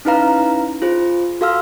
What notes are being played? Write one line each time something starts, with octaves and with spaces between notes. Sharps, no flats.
C#4 D#4 E4 B4 F5 A#5
F4 G#4 C5
F#4 A4 F5 C6 E6 F6